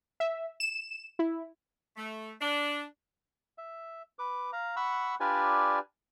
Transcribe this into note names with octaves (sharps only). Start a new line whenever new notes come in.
E5
E7
E4
A3
D4
E5
B4 D6
F5 A#5
F#5 B5 C#6 E6
D4 F4 G4 B4 D5 G#5